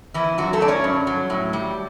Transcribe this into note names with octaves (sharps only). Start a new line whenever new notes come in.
E2 E3 E4
F#2 F#3 F#4
A3 A4
F#2 D5
C#4 C#5
G2
F#3
A2
G3